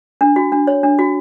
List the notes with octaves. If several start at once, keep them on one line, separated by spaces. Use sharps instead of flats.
D4
F#4
D4
C#5
D4
F#4